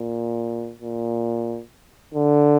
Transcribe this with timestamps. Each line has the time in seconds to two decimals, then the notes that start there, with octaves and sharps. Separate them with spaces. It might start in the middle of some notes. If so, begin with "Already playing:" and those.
Already playing: A#2
0.81 A#2
2.14 D3